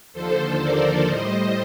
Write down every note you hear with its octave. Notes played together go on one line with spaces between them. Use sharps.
D#2 D3 F3 A4 C5
A#4 D5
A2 G3 C5 D#5